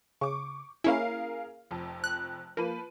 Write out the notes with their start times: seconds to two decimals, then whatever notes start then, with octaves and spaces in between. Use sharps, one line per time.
0.21 C#3 C#6 D6
0.84 A#3 C#4 E4 G#4 A#4 F5
1.71 F1 F2
2.04 F#6
2.57 F3 A#3 B4 D#7